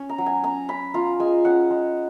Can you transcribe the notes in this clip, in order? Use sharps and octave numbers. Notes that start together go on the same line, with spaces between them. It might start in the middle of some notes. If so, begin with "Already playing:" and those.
Already playing: C#4
A#5
F#3
G#5
C#4 A#5
C#4 B5
F4 A#5
G#3 G#5
C#4 F#5
G#3